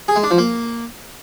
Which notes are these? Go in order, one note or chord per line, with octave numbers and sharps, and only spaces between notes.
G#4
G#3
D4
F3
A#3